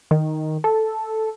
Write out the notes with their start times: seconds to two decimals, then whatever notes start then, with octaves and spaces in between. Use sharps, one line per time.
0.11 D#3
0.64 A4